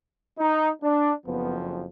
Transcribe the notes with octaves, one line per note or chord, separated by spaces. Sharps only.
D#4
D4
F#1 F2 F3 B3